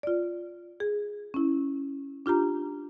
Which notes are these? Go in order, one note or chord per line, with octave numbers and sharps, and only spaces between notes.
F4 D5
G#4
C#4 E4
D4 F4 G4 A#5